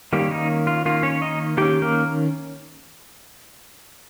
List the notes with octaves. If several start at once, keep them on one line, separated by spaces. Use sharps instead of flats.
D#3 G3 A#3 C#4 G4
D#4
F4
D#3 A#3 C#4 F4
C#4 C#5
D#4 D#5
D#3 A#3 C#4 G4 G5
A#3 A#4